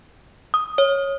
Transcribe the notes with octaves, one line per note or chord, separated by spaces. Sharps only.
D#6
C#5